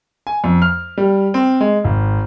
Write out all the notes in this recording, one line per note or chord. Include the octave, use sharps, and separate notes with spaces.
G#5
F2
F6
G3
C4
G#3
G#1